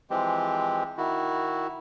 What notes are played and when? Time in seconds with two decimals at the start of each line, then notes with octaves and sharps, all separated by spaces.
0.10 E3 F3 G#3 C4 G4
0.98 D#3 E4 F#4